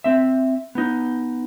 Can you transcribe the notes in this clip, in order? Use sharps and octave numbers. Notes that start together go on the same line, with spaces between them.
C4 E5
B3 D#4